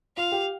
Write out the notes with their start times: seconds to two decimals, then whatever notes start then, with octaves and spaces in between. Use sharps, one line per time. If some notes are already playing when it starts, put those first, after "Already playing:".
0.17 F4 F5
0.32 G4